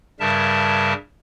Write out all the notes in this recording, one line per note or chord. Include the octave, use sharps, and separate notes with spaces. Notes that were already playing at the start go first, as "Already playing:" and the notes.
G2 C#3 G3 A#4 E5 A5